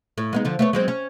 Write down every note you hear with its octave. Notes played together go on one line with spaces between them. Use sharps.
A2
G#3 B3 D#4
D3 F3
A3 B3 C#5
F#3 G#3 C4
C#4